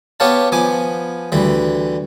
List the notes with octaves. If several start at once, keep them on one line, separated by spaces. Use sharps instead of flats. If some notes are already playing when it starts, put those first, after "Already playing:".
B3 G4 C#5 F5 A5
F3 B3 G#5 D6
D2 E3 G3